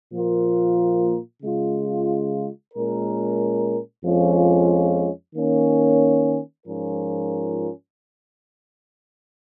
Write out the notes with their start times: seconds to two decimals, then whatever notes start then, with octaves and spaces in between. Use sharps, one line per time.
0.14 A#2 F3 A#3 F4 A#4
1.43 C#3 G#3 F4
2.73 A#2 G#3 C#4 A#4
4.04 F2 F3 G#3 C#4 F4
5.36 D#3 A#3 C#4
6.65 G#2 F3 C#4 F4 A#4